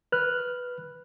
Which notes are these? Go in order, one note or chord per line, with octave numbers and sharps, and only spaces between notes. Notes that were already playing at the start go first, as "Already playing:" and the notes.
B4 F6 F#6